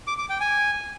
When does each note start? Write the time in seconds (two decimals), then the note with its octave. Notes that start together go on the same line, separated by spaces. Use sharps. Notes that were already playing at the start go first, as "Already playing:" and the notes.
0.07 D6
0.18 D6
0.29 G5
0.40 G#5